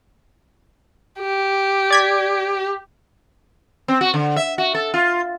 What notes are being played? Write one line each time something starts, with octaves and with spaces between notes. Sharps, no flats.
G4
D5 G#6 B6
C4
F#4
D3
E5
F#4
A4
F4